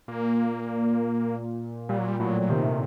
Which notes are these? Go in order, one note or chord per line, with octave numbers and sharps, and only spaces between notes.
A#2 A#3
A#2 G3
F#3
G3
A2 F#3
F#3
C3 D#3